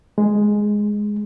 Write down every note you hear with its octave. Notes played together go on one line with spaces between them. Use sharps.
G#3